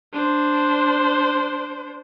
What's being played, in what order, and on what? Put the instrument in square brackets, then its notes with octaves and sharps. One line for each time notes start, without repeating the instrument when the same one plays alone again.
[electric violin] D4 C5